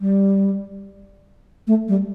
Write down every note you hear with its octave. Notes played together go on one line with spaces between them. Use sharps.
G3
A3
G3